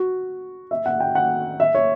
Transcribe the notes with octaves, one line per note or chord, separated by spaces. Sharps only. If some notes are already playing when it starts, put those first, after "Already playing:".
Already playing: F#4
E5
F#5
G5
F#5
E5
C#5